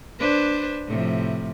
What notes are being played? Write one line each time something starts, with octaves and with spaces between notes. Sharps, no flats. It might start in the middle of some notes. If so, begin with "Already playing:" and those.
D4 B4 C5
A2 C3 F3